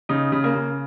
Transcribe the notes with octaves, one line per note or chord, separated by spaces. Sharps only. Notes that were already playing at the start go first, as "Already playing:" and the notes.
C#3 D#4
C#3
A#3
C#3